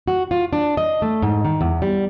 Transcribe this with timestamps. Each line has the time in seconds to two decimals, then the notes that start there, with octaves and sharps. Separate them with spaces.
0.08 F#4
0.31 F4
0.53 D4
0.77 D#5
1.02 A3
1.22 G#2
1.45 D#3
1.61 E2
1.82 G3